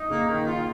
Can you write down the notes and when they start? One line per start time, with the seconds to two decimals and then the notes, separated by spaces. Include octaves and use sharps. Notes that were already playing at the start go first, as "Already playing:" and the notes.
Already playing: D#4
0.10 A#2 C#3 A#3
0.28 D#3
0.47 F4